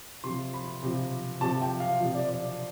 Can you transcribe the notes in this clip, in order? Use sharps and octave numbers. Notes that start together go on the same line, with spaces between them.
C3 F3 C6
B5
C3 F3
C3 F3 A5
G5
F5
C3 F3
D5
D5